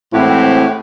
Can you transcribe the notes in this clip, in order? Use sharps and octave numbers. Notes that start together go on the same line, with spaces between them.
A2 E3 G#3 C4 E4 F#4 G4